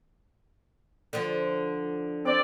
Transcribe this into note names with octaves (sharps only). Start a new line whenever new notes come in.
D3 F3
C4 D5